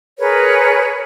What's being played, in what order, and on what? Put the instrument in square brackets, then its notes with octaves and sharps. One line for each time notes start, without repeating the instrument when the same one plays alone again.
[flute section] G#4 A#4 B4 C#5